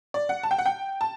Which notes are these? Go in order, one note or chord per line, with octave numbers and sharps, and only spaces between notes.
D5
F#5
A5
G5
F#5
G5
A5